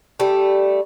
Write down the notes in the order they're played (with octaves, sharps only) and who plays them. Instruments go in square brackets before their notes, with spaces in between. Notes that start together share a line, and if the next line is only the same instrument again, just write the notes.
[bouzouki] G3 A3